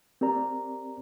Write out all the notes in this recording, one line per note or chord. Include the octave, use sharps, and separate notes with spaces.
C4 G4 A#4 D5 A#5